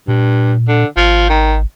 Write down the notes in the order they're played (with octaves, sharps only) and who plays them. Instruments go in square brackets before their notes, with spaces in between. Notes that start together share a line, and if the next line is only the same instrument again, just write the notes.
[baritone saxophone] G2 [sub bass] A#2
[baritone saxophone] D3
[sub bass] G#1 [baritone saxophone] F3
[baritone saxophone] D#3